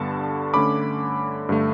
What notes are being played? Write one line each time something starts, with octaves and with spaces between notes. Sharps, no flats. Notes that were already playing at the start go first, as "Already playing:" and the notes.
Already playing: G2 D3 G3 B3 D4 A5 C#6
D3 A3 C#4 B5 D6
G2 D3 A3